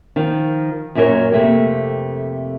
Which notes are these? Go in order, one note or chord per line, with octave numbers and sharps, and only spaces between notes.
D#3 F3
F#2 A#2 F#3 G4 A#4 C#5
F2 C3 A3 A#3 G4